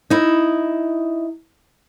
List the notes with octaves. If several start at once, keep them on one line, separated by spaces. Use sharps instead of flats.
D#4 E4